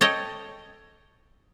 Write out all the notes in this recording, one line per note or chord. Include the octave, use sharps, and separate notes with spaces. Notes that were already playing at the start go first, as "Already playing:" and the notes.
A4 C#5 D#5 G5